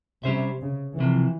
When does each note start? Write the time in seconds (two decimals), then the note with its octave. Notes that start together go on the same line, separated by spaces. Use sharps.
0.24 C3 G3 C#4 G4 C5 E5
0.61 C#3
0.98 C2 C3 E3 F3